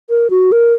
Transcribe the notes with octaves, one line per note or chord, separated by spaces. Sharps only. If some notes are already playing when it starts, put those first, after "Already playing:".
A#4
F#4
A#4